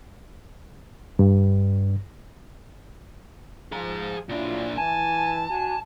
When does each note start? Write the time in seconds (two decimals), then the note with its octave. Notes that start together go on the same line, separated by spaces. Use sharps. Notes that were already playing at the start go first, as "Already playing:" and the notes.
1.19 G2
3.72 F3 G#4 A#5
4.29 A#2 F#3 D4 E4 F4
4.78 E3 G#5 A5
5.50 D4 F#4 G#5